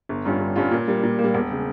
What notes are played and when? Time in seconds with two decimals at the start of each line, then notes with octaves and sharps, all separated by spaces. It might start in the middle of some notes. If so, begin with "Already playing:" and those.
0.09 G1
0.25 G2 G3 C#4 F4
0.40 G1
0.56 G2 G3 C#4 F4
0.71 A#2
0.87 G3 A#3
1.03 A#2
1.19 A#3
1.24 G3
1.34 E1
1.51 C#3